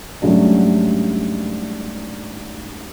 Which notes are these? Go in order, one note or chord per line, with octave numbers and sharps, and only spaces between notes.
G#2 F#3 G3 A3 C#4 D4